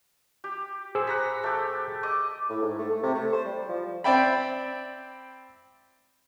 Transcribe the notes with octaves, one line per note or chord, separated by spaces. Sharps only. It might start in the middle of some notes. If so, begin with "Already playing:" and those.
G4
G#4 C5 E6
F#5 A#5 B5
A3 G4
D#5 D6 D#6
A2
G#2
A3
A3
C3
A3
C5
G3
F3
C4 D5 E5 G5 B5